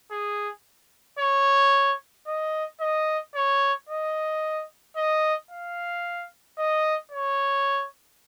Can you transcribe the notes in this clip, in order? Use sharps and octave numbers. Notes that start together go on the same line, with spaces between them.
G#4
C#5
D#5
D#5
C#5
D#5
D#5
F5
D#5
C#5